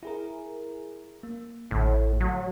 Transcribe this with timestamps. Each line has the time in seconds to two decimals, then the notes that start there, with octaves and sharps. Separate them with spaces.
0.03 E4 G#4 A#4
1.23 A#3
1.71 A1 A2 D3
2.20 F#3